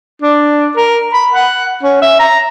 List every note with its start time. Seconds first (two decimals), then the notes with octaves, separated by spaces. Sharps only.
0.22 D4
0.77 A#4
1.14 B5
1.33 F#5
1.83 C#4
2.02 E5
2.20 A#5